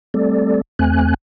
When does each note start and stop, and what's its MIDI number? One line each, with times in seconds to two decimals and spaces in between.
0.14 0.61 55
0.14 0.61 57
0.14 0.61 60
0.14 0.61 69
0.14 0.61 74
0.79 1.14 40
0.79 1.14 57
0.79 1.14 60
0.79 1.14 80
0.79 1.14 90